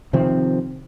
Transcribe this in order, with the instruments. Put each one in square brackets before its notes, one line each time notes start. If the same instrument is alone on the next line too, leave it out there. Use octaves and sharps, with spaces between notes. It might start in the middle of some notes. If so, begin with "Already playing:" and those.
[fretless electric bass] C3 D#3 F3 C4